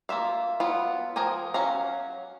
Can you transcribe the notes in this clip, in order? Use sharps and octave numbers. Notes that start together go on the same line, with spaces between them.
A#3 F4 E5 F5
F#3 B3 F4
F3 G#4 A#4 G5 G#5
F#3 C#4 F5 A#5